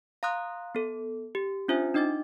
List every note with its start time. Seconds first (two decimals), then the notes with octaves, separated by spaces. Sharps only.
0.23 F5 A#5 C6 D#6 F#6
0.75 B3 A4
1.35 G4
1.68 C#4 D4 F4 C5 E5 G#5
1.94 D4 D#4 D#5 D6 A6